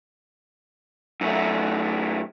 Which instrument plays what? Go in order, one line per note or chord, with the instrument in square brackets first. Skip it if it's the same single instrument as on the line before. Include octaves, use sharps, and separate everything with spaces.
[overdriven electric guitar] F#2 A3